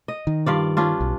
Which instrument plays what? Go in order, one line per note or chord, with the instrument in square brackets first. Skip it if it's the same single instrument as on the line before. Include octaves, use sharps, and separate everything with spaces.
[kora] D#5
[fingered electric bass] D#3
[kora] G2 F4 D5
C#4 D4 F4
[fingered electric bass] B1